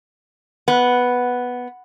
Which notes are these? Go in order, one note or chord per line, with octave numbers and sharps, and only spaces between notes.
B3